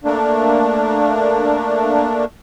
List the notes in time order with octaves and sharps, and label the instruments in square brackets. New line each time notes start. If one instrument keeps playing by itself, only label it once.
[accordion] A3 A#3 D4